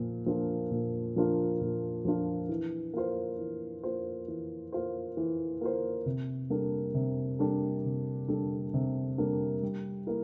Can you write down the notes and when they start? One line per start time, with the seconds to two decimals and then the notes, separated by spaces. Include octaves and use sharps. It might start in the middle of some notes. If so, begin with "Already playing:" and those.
Already playing: A#2 F3 A#3
0.26 F3 A#3 D4 F4
0.71 A#2
1.16 F3 A#3 D4 F4
1.61 A#2
2.05 F3 A#3 D4 F4
2.49 E3
2.94 A#3 F4 C5
3.39 E3
3.84 A#3 F4 C5
4.28 E3
4.73 A#3 F4 C5
5.17 E3
5.61 A#3 F4 C5
6.06 C3
6.50 G3 A#3 D4 A4
6.94 C3
7.39 G3 A#3 D4 A4
7.85 C3
8.28 G3 A#3 D4 A4
8.74 C3
9.18 G3 A#3 D4 A4
9.63 G3
10.07 A#3 E4 A#4